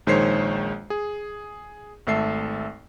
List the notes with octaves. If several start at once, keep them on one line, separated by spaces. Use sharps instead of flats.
A#1 D#3 G#3 C5 C#5 C7
G#4
G#1 A3 A4 E5 C7